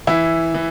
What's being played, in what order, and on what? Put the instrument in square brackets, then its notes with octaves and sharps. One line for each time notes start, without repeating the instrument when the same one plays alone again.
[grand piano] E3 E4
E3